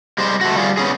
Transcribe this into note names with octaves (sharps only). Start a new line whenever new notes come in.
G3 G#3 C5
A3 F#4
G3 F4 G4 G#4
B3 C#4 G#4